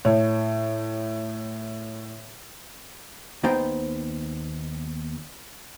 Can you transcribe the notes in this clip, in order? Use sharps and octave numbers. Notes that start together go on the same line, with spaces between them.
A2 C#5
D#2 B3 D#4 C5 G5